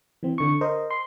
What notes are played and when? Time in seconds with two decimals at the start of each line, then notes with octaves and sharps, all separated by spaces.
0.23 E3 C4
0.38 D3 C#6
0.61 A#4 C5 D#5
0.91 C6